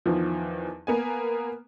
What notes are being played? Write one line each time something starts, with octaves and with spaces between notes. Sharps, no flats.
E2 D#3 F3
A#3 B3 G#5